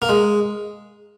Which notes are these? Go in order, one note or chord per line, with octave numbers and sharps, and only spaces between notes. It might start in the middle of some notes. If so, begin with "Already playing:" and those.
A#3
G#3